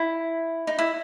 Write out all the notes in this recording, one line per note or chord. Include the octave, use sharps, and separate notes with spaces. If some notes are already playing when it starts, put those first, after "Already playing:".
Already playing: E4
D#4
E4